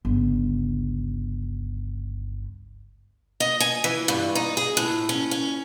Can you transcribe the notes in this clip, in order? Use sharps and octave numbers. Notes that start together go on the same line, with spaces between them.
G1 C#2
D#5
G#5
E3
G2
D#4
G#4
A2
C#4
C#4